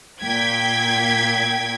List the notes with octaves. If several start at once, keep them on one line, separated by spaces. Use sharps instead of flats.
A#2 G5 G#6 B6